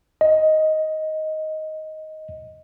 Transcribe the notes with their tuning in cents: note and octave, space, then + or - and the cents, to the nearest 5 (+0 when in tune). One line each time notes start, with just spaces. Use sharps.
D#5 +10